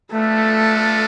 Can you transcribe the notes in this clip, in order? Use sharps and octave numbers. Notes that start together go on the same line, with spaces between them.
A3 B3 D4 F4 A4